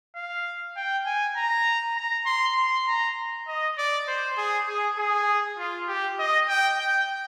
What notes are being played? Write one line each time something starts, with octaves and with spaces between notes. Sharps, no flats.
F5
G5
G#5
A#5
A#5
C6
C6
A#5
D#5
D5
C5
G#4
G#4
G#4
F4
G4
D#5
G5
G5